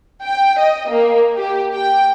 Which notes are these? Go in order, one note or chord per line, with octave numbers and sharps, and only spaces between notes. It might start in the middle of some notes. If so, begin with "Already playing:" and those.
G5
D#5
A#3
G4
G5